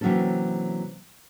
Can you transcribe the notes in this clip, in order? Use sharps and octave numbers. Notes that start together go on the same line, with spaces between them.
C3 E3 F#3 A#3 C#4 A4